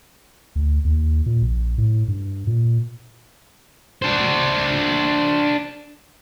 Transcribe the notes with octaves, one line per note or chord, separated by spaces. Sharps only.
D2
D#2
A#2
A#1
A2
G2
A#2
D4 C5